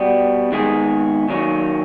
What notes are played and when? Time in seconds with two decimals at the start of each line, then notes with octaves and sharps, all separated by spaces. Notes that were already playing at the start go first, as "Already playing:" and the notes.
Already playing: B2 G3 B3
0.52 D#3 G#3 B3 D#4 G#4
1.28 D#3 F#3 A#3 C#4